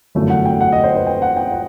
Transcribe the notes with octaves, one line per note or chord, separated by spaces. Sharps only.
G1 F#2 E3 A3
F#5
G5
F#5
D#5
C5
B4
G5
F#5
G5
F#5